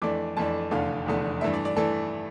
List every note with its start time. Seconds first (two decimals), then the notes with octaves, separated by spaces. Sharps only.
0.02 F2 E3 A3 D4 D6
0.37 F2 E3 A3 D4 A5
0.71 F1 E2 D3 A3 F5
1.06 F1 E2 D3 A3
1.41 G2 E3 A3 D4 E5
1.54 D5
1.65 D5
1.77 E3 A3 D4 A4